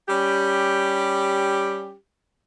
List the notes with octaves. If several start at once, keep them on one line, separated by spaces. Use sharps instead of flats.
G3 C#4 G4